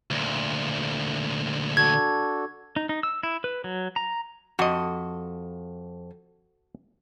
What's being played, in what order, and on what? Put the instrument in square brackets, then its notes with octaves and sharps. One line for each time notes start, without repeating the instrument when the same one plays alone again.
[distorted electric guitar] D2 A#2
[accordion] D4 F#4 A4 [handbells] G#6
[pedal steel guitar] D#4
D#4
E6
E4
B4
F#3
A#5
[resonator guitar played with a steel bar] F2 [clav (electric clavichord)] F#4 D#5